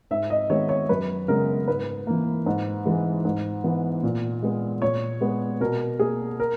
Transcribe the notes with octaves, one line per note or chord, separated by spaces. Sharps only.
G#2 E5
D#5
D#3 G#3 B3 C#5
C#5
F#2 B4
C#3 G#3 B3 A#4
G#2 B4
E3 A#3
G#2
E3 G#3
G#2
E3 B3
A#2
G#3 B3
A#2 C#5
G#3 B3
B2 A#4
A#3 G#4
A#4